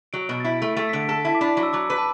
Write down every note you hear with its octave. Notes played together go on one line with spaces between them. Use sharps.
F#3 D7
B2
A6
E4 B6
A3
A3 A6
B6
D3 D7
A4 B6
E4 A5
D6
D4 B5
F#3
E6
F#3 D6
B4
A5